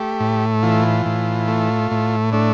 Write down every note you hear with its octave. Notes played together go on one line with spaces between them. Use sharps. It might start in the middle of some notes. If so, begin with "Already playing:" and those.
Already playing: A3 G4
A2
E3 F4
A2
A3
A2
A3 D4